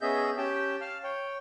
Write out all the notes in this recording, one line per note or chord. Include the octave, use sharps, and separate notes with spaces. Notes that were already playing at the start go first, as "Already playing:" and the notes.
B3 C#4 G#4 D#5 E5 G6
C#4 G4 G5 A5
F5 A5 F6
C#5 G5